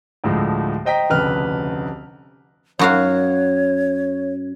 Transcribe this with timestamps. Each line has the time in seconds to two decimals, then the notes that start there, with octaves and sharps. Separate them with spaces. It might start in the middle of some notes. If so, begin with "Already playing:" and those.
0.24 D2 A2 F3 G#3 A3
0.85 C5 D#5 G5 A#5 B6
1.10 F1 D2 C#3 B4 F6
2.79 F#2 F#4 C#5 F5